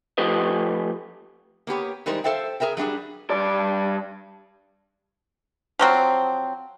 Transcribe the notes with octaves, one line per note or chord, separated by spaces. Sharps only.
F3 A3 G4 B4 D#5
A#3 B3 G4 C#5
E3 G3 G#3 D#4 A#4 C5
A4 C5 E5 F5 G5
G#4 A#4 E5 G5
F#3 G3 D4 G#4
G2 D5
F3 F#3 C4